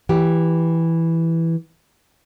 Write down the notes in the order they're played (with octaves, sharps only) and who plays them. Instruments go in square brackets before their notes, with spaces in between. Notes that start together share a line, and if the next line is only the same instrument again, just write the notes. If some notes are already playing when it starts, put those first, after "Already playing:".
[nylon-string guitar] E3 G4